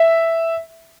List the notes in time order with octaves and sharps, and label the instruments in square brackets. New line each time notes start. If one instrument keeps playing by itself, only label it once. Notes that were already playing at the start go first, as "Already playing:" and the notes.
Already playing: [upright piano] E5